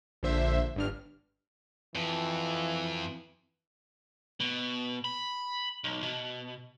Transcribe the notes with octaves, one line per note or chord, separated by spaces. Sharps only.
A#1 D3 C5 E5
G1 G2 F6
F2 E3
B2
B5
B1
B2